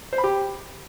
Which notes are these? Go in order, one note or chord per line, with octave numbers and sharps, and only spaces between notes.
C5
B5
G4